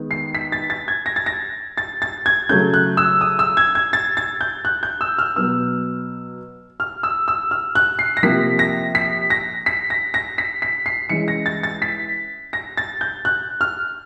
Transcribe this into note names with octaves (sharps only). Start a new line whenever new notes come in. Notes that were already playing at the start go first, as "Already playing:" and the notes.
Already playing: D#3 G#3 B3
C7
B6
A6
A6
G#6
A#6
A6
A#6
A6
A6
G#6
C#3 F#3 A3 C#4 G6
F#6
E6
D#6
E6
G#6
G#6
A6
A6
G6
F#6
G6
E6
F6
B2 F#3 B3 E6
F6
E6
E6
F6
F#6
C7
A#6
C3 F3 A#3 B6
A#6
B6
A#6
B6
A#6
A#6
B6
B6
C7
E3 G#3 C#4 C#7
A#6
A6
A6
B6
A#6
A6
G6
F#6
F6